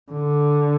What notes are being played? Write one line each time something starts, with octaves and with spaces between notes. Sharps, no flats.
D3